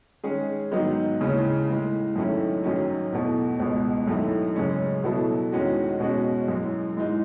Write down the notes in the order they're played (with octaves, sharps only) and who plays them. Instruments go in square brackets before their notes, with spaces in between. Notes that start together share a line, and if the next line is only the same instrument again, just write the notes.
[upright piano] D#3 G#3 C#4 G#4
G#2 D#3 F#3 B3 D#4
D#2 C#3 E3 G#3 C#4
A2 E3 G#3
F#2 D#3 A3 C#4 E4
F#2 D#3 F#3 C#4
E2 B2 A3
C#2 B2 G#3
F#2 D#3 A3 E4
F#2 C#3 G#3 C#4
B2 F#3 B3 E4 A4
E2 D#3 G#3 C#4 F#4
B2 G#3 C#4 F#4
F#2 E3 G#3
G#2 E3 G#3 D#4